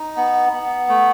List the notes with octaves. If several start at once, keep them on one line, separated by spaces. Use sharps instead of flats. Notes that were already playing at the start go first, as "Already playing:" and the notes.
Already playing: D#4
B3
B3
A3